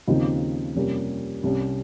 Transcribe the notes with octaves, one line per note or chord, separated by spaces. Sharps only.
D#2 C#3 F3 C4 D#4
F2 C3 G3 A#3 C#4
C2 C3 G3 C#4